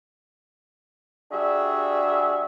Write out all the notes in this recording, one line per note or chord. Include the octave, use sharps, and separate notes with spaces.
G3 D4 F#4 G#4 E5